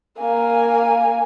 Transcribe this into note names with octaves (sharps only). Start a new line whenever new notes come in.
A#3 G#5